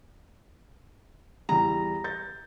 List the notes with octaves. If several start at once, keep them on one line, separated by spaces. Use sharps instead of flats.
E2 G3 A#5
G6 A6